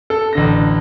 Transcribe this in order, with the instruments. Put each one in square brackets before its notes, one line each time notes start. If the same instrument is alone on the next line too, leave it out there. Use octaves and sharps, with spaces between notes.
[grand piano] A4
A1 D3 A#6